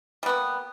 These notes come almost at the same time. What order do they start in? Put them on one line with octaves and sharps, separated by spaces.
G3 B3 A#3